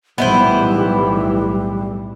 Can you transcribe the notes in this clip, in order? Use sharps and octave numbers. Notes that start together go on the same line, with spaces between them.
B1 A2 E3 G3 B3 E4 C5